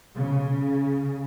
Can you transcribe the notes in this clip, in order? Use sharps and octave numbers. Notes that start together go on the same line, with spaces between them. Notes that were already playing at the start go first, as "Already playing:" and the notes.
C#3